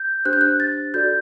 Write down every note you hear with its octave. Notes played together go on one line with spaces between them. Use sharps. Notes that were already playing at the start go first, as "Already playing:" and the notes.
Already playing: G6
D4 G4 C5 F#6
G6
F#6
A6
F#4 A4 D5 G6